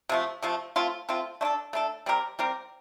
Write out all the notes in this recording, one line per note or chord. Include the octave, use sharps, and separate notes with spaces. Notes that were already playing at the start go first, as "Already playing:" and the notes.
C3 F3 A3
C3 F3 A3
A3 C4 F4
A3 C4 F4
A3 D4 A4
A3 D4 A4
G3 C4 G4 A#4
G3 C4 G4 A#4